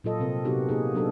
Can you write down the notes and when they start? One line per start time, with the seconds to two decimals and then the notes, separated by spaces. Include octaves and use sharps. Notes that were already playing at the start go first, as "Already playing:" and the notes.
0.04 A#2 F#3 F4 A4 D#5
0.20 C3 C4 A#4
0.45 C3 B3 D#4 F#4 G4
0.69 A#3 D#4 G#4
0.94 F#3 B3 D4 D#4 A4